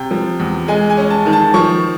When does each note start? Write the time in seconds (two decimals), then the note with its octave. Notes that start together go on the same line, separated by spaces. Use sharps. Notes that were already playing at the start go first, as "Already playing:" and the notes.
Already playing: C3 G5
0.11 F3
0.40 E2
0.68 G#3 G#5
0.90 G#5
0.97 C#4
1.10 A5
1.26 D#3
1.33 A5
1.54 F3 C#6